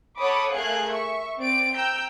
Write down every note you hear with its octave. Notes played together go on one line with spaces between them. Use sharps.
A4 C#5 F#5 B5 D6 D#6
A3 G#4 A#4 F5 F#6 G#6
E5 C#6
C4 D5 D7
G5 A#5 E6 G6